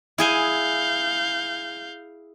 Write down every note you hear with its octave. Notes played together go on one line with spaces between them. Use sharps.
E4 G#4 F5 G#5 G6